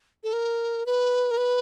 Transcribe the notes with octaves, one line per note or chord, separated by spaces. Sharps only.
A4
A#4
B4
A#4
B4